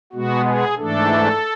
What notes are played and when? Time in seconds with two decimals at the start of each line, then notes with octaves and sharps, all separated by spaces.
0.13 B2 G#3 B3 F#4
0.46 G#4
0.77 G#2 E3 A3 D4 A4